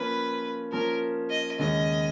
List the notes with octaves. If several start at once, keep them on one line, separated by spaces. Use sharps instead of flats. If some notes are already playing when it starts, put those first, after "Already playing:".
Already playing: F3 A#3 C#4 B4
F3 A#3 C#4 A#4
D#5
D#2 C#3 G#3 C#4 D#5